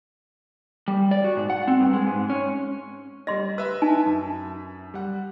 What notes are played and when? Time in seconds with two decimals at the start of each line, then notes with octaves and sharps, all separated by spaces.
0.88 G3
1.11 D5
1.24 F#4
1.37 G#2
1.50 F#5
1.68 C4
1.80 G2
1.93 G#3
2.07 G#2
2.30 C#4
3.27 G3 D#5 C6 A#6
3.58 B4 E5 B5 E6
3.82 D#4 G#5 A5
4.06 F#2
4.94 G3 F#5